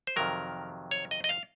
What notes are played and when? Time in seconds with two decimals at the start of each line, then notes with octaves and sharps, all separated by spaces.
0.07 C5
0.16 F2 C3 D#3 F#3 A#4
0.91 C#5
1.11 D#5
1.24 D#5
1.29 F5